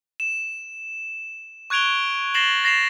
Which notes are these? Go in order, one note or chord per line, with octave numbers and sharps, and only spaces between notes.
E7
C#6 F#6 G#6 D7 F7 G7
A6 A#6 C7 E7 F#7 G7
A6 A#6 C7 E7 F7